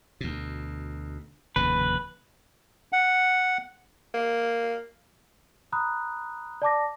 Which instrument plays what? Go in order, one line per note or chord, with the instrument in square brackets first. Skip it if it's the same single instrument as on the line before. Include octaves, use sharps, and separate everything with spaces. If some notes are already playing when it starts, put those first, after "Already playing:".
[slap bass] D2 B2
[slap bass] F1 D#2 C#3 [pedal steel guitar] B4
[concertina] F#5
[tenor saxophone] A#3
[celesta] A#5 B5 D#6 F#6
D5 A5 D6 A#6